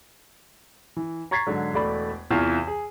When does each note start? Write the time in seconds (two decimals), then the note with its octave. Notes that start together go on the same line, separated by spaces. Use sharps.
0.97 E3
1.31 A#5 C#6 G#6 A6 B6 C7
1.47 G#2 D3 F#3
1.74 E1 A3 D5 B5
2.31 E2 C3 E3 F4 F5 C#6
2.67 G#4